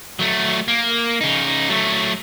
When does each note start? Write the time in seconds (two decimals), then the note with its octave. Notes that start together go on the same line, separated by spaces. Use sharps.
0.19 F#3 A3
0.68 A#3
1.21 C#3 D#4
1.69 F#3 A3